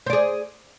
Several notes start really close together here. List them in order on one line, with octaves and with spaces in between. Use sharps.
C5 D5 G#4